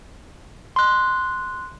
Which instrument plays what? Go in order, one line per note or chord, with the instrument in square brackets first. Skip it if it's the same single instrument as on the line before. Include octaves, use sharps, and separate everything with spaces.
[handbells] C6 F#6